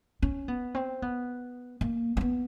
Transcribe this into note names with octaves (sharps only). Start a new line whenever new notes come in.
C#4
B3
C4
B3
A#3
A#3
B3